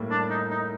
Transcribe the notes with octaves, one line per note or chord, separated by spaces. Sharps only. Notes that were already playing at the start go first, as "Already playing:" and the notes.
Already playing: A2 G3 A#3
D4
D#4
D#4